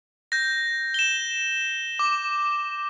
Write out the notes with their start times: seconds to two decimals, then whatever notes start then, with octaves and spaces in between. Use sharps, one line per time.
0.32 G6 A#6
0.94 E7 G7
1.99 D6